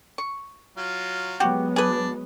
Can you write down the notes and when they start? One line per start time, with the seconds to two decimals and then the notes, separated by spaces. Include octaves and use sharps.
0.18 C#6
0.77 F#3 F4
1.40 F#3 G#3 B3 F#4 G4
1.76 D4 G#4 B4 D5